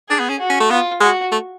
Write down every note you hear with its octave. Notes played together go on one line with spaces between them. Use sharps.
D4 G#4
B3
C#4
F#4
C#4
A3
B3 F4
G#3 F#4
A3